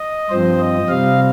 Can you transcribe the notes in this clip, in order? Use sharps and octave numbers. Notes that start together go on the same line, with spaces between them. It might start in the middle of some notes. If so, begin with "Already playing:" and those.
Already playing: D#5
G2 F3 C4 C5
D#5
C3 G3 C4 F5